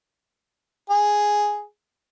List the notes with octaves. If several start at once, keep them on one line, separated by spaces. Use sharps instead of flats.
G#4